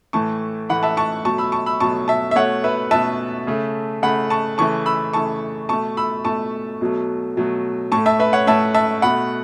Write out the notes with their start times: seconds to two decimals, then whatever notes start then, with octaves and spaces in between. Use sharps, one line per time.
0.13 A2 E3 A3 A5 C#6
0.70 A2 E3 A3 F#5 B5
0.83 E5 A5
0.97 A5 C#6
1.25 B2 F#3 A3 A5 C#6
1.38 B5 E6
1.52 A5 C#6
1.66 B5 E6
1.80 B2 F#3 A3 A5 C#6
2.08 E5 A5
2.31 E5
2.36 B2 A3 C#5 F#5
2.64 B4 E5
2.91 B2 A3 E5 A5
3.47 C#3 A3
4.02 C#3 A3 F#5 B5
4.30 A5 C#6
4.58 C#3 E3 A3 A5 C#6
4.86 B5 E6
5.13 C#3 E3 A3 A5 C#6
5.69 B2 A3 A5 C#6
5.97 B5 E6
6.25 B2 A3 A5 C#6
6.81 B2 F#3 A3
7.37 B2 F#3 A3
7.92 A2 A3 A5 C#6
8.06 E5 A5
8.20 B4 E5
8.33 C#5 F#5
8.47 A2 A3 E5 A5
8.75 E5 A5
9.02 B2 A3 F#5 B5